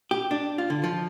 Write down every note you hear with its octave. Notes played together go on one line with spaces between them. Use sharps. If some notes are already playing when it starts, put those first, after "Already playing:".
G4
D4
F4
D3
F3